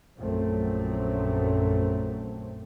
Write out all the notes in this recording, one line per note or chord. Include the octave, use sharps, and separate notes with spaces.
A#1 F#2 F#3 A3 C4